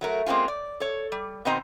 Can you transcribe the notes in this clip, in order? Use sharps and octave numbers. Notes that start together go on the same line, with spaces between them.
F#3 A3 A#4
G#3 A#3 C4 C#4 F4
D5
A4 C#5
G3
B2 D#3 C4 C5 D#5 A#5